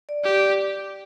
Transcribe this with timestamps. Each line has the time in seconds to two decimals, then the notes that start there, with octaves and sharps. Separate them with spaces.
0.09 D5
0.24 G4